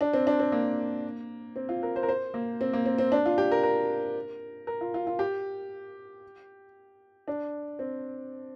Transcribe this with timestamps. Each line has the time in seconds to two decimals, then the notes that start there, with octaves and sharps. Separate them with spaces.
0.01 D4
0.13 C4
0.27 D4
0.40 C4
0.52 A#3
1.56 C4
1.69 F4
1.83 A#4
1.96 C5
2.03 A#4
2.09 C5
2.34 A#3
2.61 C4
2.73 A#3
2.86 C4
2.98 C4
3.12 D4
3.26 F4
3.38 G4
3.52 A#4
3.63 A#4
4.67 A#4
4.81 F4
4.94 F4
5.07 F4
5.19 G4
7.28 D4
7.79 C4